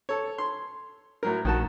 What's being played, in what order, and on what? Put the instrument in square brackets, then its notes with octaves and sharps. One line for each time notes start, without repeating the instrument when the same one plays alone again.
[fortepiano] A4 C#5
C6
A2 F#3 A#4
[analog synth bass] A#1 [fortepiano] D#3 F#4 A5